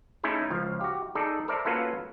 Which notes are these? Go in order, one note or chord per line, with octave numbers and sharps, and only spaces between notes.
A3 C#4 D#4 E4 G#4
C#2 F3 F5
F#4 G4
D#4 G#4 A4 D5
A4 A#4 C5 D5 E5
A#3 C#4 F4 F#4 A4 B4